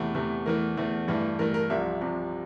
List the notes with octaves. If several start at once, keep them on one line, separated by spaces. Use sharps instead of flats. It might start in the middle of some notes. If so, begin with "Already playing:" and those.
Already playing: E2 C3 E3 A3 E4
E2 C3 E3 A3
E2 E3 A3 A#4
E2 E3 A3
G2 E3 A3
G2 E3 A3 A#4
A#4
C2 C3 F3 E5
C2 C3 F3